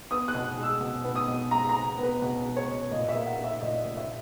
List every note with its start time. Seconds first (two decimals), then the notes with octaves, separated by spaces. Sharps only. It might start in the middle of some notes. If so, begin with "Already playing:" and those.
0.11 B3 D#6
0.28 F#6
0.34 B2
0.57 G#3
0.63 E6
0.81 B2
1.04 B3
1.15 D#6
1.28 B2
1.51 G#3 A#5
1.69 A#5
1.74 B2
1.98 B3
2.03 B4
2.22 B2
2.45 G#3
2.56 C#5
2.68 B2
2.91 A#2 D#5
3.09 E5
3.15 A#3
3.26 F#5
3.38 A#3
3.44 E5
3.62 A#2 D#5
3.85 A#2
3.97 E5